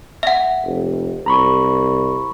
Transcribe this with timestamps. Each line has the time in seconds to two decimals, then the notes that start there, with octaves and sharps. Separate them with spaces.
0.23 E5 F#5
0.64 F1
1.26 C2 A#5 B5 C#6